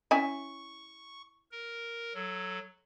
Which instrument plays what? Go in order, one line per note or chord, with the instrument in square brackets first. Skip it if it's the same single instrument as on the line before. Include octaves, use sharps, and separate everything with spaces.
[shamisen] C#4 E4 G#5 [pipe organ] C#6
[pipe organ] A#4
F#3 A4